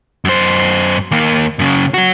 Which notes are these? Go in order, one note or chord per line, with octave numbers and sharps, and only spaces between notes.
F#2 C5
D#2 A#3
F#2 C#3
F#3 F#4